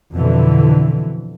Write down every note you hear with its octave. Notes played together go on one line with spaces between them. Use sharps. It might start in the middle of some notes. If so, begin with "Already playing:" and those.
F2 B2 D3 E3